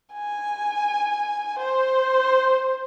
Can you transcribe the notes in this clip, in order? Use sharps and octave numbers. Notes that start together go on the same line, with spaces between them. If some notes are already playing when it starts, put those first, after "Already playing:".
G#5
C5